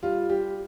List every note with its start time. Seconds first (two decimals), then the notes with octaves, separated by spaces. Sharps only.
0.03 G3 F4
0.29 G3 G4